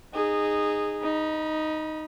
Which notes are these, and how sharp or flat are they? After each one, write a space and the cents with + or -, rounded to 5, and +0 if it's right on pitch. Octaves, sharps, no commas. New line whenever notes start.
D#4 -15 G#4 -10
D#4 +0 B5 -35